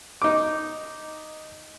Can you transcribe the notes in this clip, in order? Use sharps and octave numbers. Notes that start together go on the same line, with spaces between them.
D#4 D6